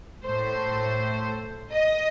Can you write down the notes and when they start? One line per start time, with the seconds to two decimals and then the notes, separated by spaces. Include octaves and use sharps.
0.23 A2 A3 C5
1.72 D#5